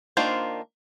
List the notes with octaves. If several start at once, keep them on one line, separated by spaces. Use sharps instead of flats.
D#3 A#3 D4 F4 C5